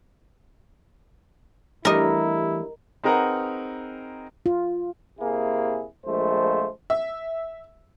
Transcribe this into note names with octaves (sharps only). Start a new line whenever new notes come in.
E2 G3 A3 D4 E4 G4 A#4 D#5
C4 D#4 G#4 A#4 B4 F#5
F4
C3 A#3 E4 G#4
A#1 F3 G#3 A3 C5
E5